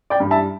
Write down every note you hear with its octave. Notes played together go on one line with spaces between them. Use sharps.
D5 G5
G2 G3
E5 A5